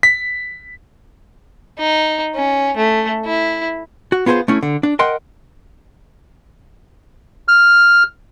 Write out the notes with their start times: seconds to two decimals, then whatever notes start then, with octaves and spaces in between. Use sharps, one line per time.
0.03 B6
1.79 D#4
2.35 C#4
2.77 A3
3.26 E4
4.12 F#4
4.26 B3 F4 G#4 A#4 C5
4.48 A3 C#4 E4
4.63 D3
4.83 D4
4.99 A#4 D#5 F#5 G5 C6
7.48 F6